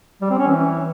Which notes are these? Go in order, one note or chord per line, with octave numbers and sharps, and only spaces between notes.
G3
C4
C#4
E3